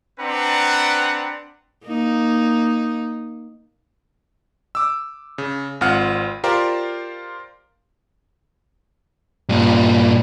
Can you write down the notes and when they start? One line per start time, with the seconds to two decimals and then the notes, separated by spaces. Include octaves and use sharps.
0.20 C4 D4 B4 F#5 A#5
1.86 A#3 D#4
4.75 D6 E6
5.38 C#3
5.81 G#1 C4 F4 F#5 F6
6.44 F4 G4 A#4 C5 D5
9.49 G2 A#2